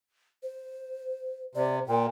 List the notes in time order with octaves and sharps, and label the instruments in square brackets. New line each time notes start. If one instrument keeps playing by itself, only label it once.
[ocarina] C5
[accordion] C3 [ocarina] D5
[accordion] A#2 [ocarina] G5